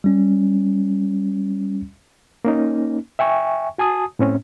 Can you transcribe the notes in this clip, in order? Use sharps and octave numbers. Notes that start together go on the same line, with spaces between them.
G3 C#4
A#3 C#4 D#4
E5 G5 G#5 C#6
F#4 G#5 A5 D#6
A2 C4 C#4